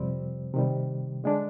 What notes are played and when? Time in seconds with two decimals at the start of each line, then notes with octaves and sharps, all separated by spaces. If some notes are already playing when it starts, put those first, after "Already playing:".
Already playing: F2 C3 G3 C4
0.54 C3 D#3 G3
1.24 D3 G#3 D4